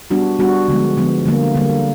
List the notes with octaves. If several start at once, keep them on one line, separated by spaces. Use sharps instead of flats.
G3 B3 D4 F#4
G3 B3 D4 F#4
D3 F3 G#3 B3
D3 F3 G#3 B3
D3 G3 A#3
D3 G3 A#3